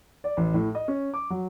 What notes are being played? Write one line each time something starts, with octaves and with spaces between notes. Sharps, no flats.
D5
A1
A2
D#5
C#4
D6
F#3